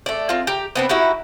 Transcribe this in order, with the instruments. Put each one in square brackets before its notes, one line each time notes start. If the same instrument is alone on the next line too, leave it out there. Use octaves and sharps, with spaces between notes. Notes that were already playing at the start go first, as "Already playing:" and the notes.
[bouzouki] A3 D5
C4 F4
G4 A#5
B3 C4 D4
D#4 E4 F#4 G4